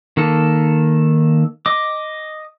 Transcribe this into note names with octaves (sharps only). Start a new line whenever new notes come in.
D#3 A#3 A4
D#5 D6